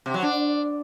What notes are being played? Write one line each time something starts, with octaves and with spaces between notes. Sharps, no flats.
C3
F#3
D4